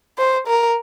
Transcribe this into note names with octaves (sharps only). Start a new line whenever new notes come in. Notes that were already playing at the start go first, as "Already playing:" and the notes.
C5
A#4